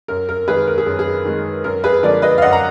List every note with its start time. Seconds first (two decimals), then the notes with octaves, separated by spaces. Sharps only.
0.08 F#2 A#4
0.29 A#4
0.48 D#3 G#3 G#4 B4
0.67 A#4
0.78 G#4
0.86 F#2
0.99 G#4
1.25 D#3 G#3
1.64 F#2 A#4
1.84 G#4 B4
2.03 D3 F3 G#3 A#4 D5
2.22 B4 D#5
2.38 F5
2.42 F#2 D#5 F#5
2.53 A#5